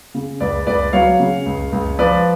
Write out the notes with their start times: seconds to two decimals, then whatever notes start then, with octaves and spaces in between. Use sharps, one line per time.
0.14 C#3
0.40 C#2 B4 D5
0.67 C#2 B4 D5
0.93 F#3 C#5 F5
1.20 C#3
1.46 C#2
1.72 C#2
1.99 F3 B4 D5